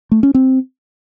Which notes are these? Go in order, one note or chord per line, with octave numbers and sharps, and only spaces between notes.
A3
C#4
C4